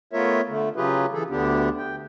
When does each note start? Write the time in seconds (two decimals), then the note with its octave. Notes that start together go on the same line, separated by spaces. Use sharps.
0.13 A3 B3 F4 A#4 C#5 E5
0.49 D3 A3
0.76 C#3 F#3 F4 G4 G#4 B4
1.13 E3 G#4 A4
1.30 D2 D3 B3 D4 G4
1.78 G5